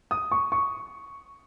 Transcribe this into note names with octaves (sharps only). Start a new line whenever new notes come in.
D#6
C#6
C#6